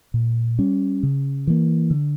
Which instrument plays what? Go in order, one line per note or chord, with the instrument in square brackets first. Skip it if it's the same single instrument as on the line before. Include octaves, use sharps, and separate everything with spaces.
[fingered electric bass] A#2
G3 C#4
C#3
E3 A#3
D3